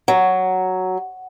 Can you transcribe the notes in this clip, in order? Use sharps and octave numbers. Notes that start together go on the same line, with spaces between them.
F#3